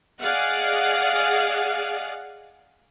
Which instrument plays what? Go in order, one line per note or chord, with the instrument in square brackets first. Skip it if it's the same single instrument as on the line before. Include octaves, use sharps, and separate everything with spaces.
[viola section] G#4 D5 D#5 F5 F#5